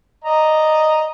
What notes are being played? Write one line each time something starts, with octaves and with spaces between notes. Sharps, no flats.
D5 D#5 A#5